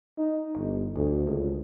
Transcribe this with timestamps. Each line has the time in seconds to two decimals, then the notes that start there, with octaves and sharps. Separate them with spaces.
0.18 D#4
0.56 G1
0.96 D2
1.27 C#2